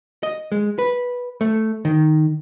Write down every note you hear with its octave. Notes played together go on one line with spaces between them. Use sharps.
D#5
G#3
B4
A3
D#3